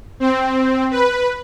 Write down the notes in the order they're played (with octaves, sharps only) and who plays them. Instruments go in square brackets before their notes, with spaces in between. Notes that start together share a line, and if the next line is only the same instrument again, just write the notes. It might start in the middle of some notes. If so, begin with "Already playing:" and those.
[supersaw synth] C4
B4